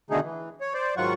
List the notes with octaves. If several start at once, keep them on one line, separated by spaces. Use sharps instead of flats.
B2 D3 D#3 A3 D#4 G#4
E3
C#5
C5 D5
G#2 D#3 F#3 F4 F#5 C#6